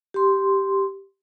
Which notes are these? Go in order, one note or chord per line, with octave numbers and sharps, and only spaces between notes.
G4 C6